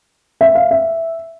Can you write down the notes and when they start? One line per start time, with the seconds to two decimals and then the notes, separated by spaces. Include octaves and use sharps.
0.41 E5
0.55 F5
0.71 E5